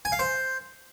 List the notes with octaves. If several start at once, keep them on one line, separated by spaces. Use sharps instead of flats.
G#5
F5
C5